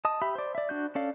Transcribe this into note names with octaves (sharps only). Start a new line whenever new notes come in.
D#5 A5 D#6
G4 E5 B5
C5 D5
D5 E5
D4 F#4 G6
C#4 A4 D5 F5